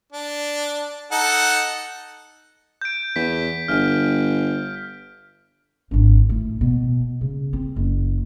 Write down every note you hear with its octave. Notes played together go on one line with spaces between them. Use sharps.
D4
D#4 A4 F#5
G6 D7
E2 B6
G1 F6
G#1 D4
A2
B2
C#3
C4
F#1